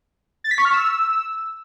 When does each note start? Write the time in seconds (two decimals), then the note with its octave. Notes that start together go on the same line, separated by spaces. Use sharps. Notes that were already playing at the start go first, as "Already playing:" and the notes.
0.44 A6
0.51 B6
0.58 C#6
0.65 F6
0.72 E6